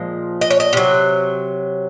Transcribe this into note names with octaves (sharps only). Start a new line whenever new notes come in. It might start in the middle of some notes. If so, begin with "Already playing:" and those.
Already playing: A#2 F3 G#3
D#5
C#5
D#5
C3 F#3